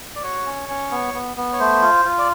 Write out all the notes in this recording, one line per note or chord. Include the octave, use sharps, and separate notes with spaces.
D5
F#4 C#5
C#4
C#4
B3
B3
B3
C#5
A3 C5
F4
F4
D5